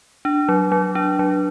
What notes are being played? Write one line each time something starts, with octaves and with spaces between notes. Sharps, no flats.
D4
F#3
F#3
D4
F#3